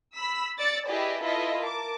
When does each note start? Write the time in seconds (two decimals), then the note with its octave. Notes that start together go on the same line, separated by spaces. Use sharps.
0.15 B5 E6 B6
0.58 D5 E6 A6 C#7 D7
0.87 E4 G4 G#4 B4 D5 D#5
1.21 E4 F4 A4 B4 D#5 E5
1.58 A#4 A5 D6